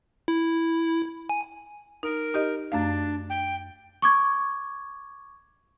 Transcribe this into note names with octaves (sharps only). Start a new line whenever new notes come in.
E4
G#5
D#4 A#4
D#4 G4 D#5
F#2 A3 D4 F5
G5
C#6 D6 G#6